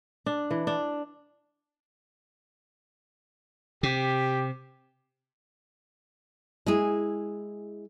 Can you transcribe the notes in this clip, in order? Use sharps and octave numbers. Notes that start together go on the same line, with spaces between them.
D4
E3
D4
C3 G4
G#3 E4 G#4